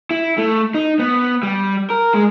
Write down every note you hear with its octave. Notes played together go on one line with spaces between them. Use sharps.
E4
A3
D#4
B3
G3
A#4
G#3